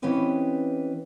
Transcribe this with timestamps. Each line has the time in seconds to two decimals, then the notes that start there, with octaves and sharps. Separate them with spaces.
0.02 E3 C4 C#4 G4 B4 D#5